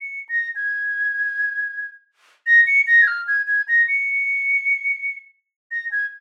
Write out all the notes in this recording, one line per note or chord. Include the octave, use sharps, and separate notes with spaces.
C#7
A#6
G#6
A#6
C#7
A#6
G#6
F6
G#6
G#6
A#6
C#7
A#6
G#6